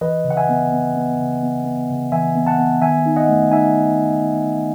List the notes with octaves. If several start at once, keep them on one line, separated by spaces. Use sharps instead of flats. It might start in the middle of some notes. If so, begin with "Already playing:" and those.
E3 B4 D#5
C#3
F#5
E5 G#5
B3
B3
B3
C#3
B3
B3
C#3
E3 E5 G#5
B3
F#5 A5
B3
D#3 E5 G#5
D#4
D#5 F#5
A3
D#4 E5 G#5